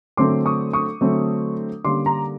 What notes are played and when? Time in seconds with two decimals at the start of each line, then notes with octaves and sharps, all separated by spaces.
0.17 D3 F#3 A3 C4 C6 D6
0.46 C#6 D#6
0.73 C#6 D#6
1.01 D3 F#3 A3 C4
1.84 D3 G3 A#3 C#4 C6 D6
2.06 A#5 C6